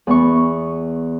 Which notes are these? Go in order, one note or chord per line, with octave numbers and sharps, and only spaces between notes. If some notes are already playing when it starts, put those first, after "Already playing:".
E2 B3 C#6